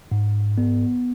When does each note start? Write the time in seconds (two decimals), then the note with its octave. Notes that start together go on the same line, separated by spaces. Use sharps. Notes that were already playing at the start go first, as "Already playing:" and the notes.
0.12 G#2
0.58 B3